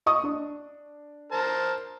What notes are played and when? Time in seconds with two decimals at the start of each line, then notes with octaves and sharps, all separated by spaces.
0.06 D#5 C#6 D#6
0.24 D4
1.32 A#4 C5 A5